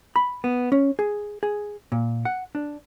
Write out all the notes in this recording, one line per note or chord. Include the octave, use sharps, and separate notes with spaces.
B5
B3
C#4
G#4
G#4
A#2
F#5
D4